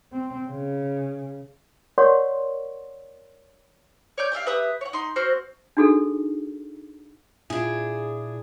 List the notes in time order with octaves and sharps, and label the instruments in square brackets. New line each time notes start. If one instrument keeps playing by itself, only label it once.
[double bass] C4
C#3
[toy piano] A#4 C#5 D5 F#5 C6 C#6
[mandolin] C#5 D5 G6
G4 D5 E5 F5
G4 B4 E5 D#6
C#5 F#5
D#4 C6
C4 F#4 C5 F6
[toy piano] D4 D#4 F#4 G#4 A4
[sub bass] A#2 [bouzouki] D4 G#4 [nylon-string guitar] E4 F4